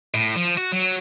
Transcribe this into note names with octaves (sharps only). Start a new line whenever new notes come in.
A2
F3
F#4
F#3